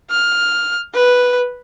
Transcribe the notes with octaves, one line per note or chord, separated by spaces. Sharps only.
F6
B4